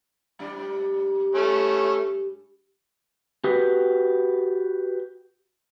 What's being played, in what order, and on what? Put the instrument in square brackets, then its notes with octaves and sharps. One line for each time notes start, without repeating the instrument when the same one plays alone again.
[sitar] G#2 G3 D4
[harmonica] A3 C#4
[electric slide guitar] F#4 G4 B4